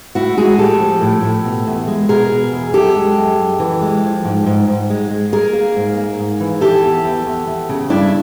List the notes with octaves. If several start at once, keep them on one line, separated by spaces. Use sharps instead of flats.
A2 E4 F#4
G#3 F#4 G#4
A2 G4 A4
F3
A2
A2
B2
E2
G#3
B2 G#4 A#4
B2
E2
F#2 G4 A4
G#3
F#2
F#2
E3
G#3
F3
G#2
G#2
G#2
G#3
G#3
A#3 G#4 A#4
A#3
G#2
A#3
G#2
E3
E3 G4 A4
E2
E2
E2
E2
C#3
G2 D4 E4